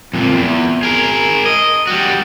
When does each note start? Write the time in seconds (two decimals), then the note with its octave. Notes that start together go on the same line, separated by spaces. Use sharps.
0.14 F2 A#2
0.34 E2
0.83 G#4 A#4
1.46 D#5
1.87 G3 F#4